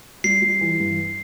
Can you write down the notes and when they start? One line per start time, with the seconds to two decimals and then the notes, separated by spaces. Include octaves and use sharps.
0.24 G3 C7
0.42 G3
0.61 E3
0.79 G2